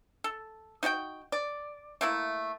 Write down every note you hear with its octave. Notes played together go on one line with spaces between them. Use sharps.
A4
D#4 F#4 D5 G5
D5
A3 A#3 E4